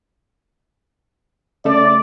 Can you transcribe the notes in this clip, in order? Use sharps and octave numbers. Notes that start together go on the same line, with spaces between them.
C#3 A3 D5